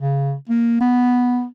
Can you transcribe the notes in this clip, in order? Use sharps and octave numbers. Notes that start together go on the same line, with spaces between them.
C#3
A#3
B3